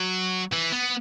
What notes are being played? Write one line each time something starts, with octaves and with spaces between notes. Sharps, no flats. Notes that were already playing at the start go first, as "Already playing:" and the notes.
Already playing: F#3
E3
B3